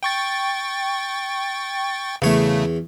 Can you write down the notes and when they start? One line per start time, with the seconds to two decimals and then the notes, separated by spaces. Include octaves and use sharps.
0.03 G5 C#6 A6
2.22 E2 C#3 A3 C#5